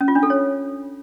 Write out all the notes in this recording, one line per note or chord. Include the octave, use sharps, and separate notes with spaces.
C#4
F4
D4
A4
C#5